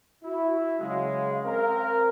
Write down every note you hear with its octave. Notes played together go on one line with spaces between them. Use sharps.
E4 F#4
C#3 F#3 G#3 F5
C4 A#4